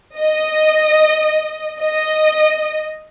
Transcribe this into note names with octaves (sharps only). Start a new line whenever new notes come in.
D#5
D#5